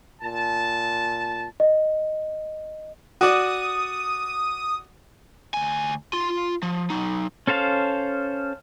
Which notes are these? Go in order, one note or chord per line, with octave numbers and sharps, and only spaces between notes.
A#2 A5
D#5
F#4 D5 D#6
D2 G#5
F4 C6
F3
F#3 D#4
C#4 A4 C5 F5 A5